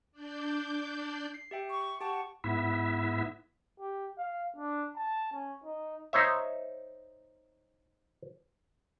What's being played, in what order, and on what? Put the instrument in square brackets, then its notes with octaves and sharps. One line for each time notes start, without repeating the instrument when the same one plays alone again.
[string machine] D4 D5 G6
[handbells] C7
G4 E5 G5
[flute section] C#6
[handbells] G4 G5 A5 [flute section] F#5 C#6
[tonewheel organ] G#2 B3 E4 E5
[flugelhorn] G4
F5
D4
A5
C#4
D#4
[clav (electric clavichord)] D#4 C5 C#5 E5